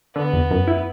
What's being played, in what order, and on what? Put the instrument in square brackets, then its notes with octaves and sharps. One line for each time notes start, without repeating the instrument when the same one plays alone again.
[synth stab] D3 [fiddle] B3
[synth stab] E2
F#2
E4